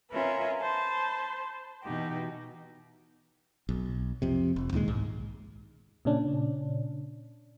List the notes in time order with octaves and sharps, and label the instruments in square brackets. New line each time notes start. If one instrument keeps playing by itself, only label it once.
[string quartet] C#4 F4 A#4 B4 E5
C5 A5 B5
B2 E3 D#4 F#4 G4
[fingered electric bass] B1
F2 C3
F1
D2 A#2 D#3 G#3
B1 G#2
[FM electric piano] A#2 C#3 C#4 D4